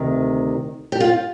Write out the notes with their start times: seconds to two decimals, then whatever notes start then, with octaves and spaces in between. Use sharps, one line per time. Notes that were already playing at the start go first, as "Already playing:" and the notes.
Already playing: D2 C3 D#3
0.92 G4
1.00 F4